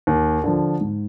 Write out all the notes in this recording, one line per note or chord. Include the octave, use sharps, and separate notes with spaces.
D#2
D3 F3
G#2